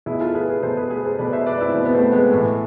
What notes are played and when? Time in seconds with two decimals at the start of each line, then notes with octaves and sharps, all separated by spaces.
0.06 B2 E4 G#4
0.21 F4 A4
0.35 G#4 B4
0.49 G#4 B4
0.63 B2 A4 C5
0.77 G#4 B4
0.90 G#4 B4
1.05 A4 C5
1.18 B2 B4 D5
1.33 C5 E5
1.46 B4 D5
1.61 C4 E4
1.75 B2
1.85 B3
1.94 A3 C4
2.12 G#3 B3
2.31 A2 E3 A3